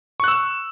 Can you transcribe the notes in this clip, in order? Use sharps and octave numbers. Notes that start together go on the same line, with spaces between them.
C#6 E6 F#6